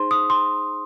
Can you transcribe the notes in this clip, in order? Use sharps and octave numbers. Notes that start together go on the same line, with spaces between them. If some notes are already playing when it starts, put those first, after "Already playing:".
Already playing: D#4 G#4 C5 C6
D#6
C6